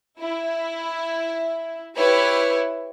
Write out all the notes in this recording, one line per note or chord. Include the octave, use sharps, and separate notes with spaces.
E4
E4 G4 B4 C#5